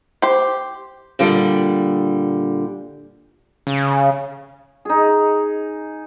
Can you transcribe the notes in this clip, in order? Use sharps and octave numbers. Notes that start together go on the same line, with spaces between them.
G4 C5
A#2 D3 G3
C#3
D#4 G#4